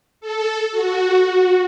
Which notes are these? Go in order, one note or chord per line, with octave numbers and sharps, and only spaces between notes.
A4
F#4